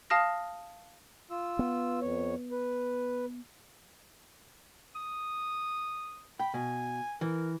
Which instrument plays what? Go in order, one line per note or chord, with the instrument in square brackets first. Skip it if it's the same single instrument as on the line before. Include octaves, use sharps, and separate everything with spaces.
[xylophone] F5 A5 D#6 F6 A#6
[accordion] F4 E6
[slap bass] B3
[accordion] F2 C#5
B4
[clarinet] D#6
[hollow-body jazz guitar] G5 [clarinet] B5
[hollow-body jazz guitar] B2 [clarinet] G#5
[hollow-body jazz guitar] E3 [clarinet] A#4